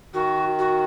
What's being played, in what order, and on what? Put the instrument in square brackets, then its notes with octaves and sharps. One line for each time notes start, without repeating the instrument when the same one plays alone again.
[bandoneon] D#3 [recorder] F#4
[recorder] F#4